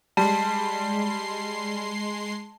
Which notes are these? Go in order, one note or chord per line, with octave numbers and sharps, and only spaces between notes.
G3 G#3 A5 C6 C7